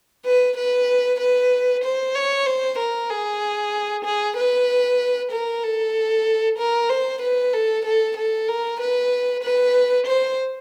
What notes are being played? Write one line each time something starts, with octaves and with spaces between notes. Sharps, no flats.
B4
B4
B4
C5
C#5
C5
A#4
G#4
G#4
B4
A#4
A4
A#4
C5
B4
A4
A4
A4
A#4
B4
B4
C5